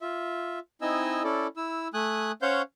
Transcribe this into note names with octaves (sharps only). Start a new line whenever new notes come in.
F4 E5
C4 D#4 E4 D#5 G#5 E6
C#4 E4 A4 D5
E4 E6
A3 G#5 D#6 F#6
C#4 C5 C#5 F5 F#5 G6